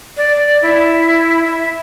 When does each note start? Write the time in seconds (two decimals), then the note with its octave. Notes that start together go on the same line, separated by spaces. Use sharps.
0.17 D5
0.62 E4
1.45 E5